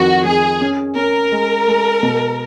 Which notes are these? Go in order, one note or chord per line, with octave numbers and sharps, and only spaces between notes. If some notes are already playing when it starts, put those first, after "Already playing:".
Already playing: F2 D#3 F#4
F2 G#4
C#4
C#4 A#4
G#3
G#3
B2